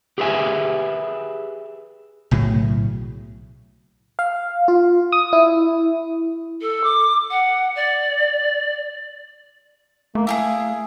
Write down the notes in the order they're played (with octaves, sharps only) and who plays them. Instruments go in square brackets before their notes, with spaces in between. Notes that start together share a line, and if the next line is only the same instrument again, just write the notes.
[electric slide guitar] G4 G#4 B4 C5 E5 G#5
[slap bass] B1 A2 C#3 F#3
[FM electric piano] F5
F4
D#6
E4
[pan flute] A4
D6
F#5
D5
[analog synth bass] A3 [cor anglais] A#3
[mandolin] E4 G4 G#4 [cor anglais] F5